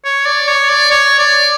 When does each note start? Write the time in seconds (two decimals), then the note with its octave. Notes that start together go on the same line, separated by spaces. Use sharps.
0.04 C#5
0.25 D5
0.48 C#5
0.69 D5
0.91 C#5
1.18 D5